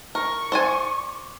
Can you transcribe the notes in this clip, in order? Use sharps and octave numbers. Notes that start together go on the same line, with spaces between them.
A#4 C#6
C5 D5 G#5